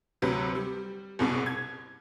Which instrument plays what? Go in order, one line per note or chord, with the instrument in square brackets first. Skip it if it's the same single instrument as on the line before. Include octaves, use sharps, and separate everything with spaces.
[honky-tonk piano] D2 C3 F#3 B4
G3
F#1 C2 B2
G#6